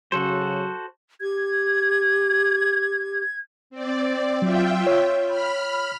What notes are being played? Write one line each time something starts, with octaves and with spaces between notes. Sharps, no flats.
C#3 F#3 F#4 A4 C5
G4 G#6
C4 D5
F#3 F4 E5 G5
C#5
B5 F6